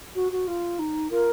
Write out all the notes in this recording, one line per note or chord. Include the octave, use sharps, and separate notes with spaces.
F#4
F#4
F4
D#4
F4 A#4